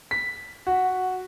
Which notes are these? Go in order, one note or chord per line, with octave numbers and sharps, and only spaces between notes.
B6
F#4